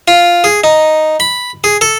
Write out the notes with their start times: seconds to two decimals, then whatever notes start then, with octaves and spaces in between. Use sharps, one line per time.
0.08 F4
0.44 G#4
0.64 D#4
1.20 B5
1.64 G#4
1.81 A4